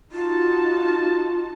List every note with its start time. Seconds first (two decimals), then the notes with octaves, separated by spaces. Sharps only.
0.12 D#4 F4 F#4 A5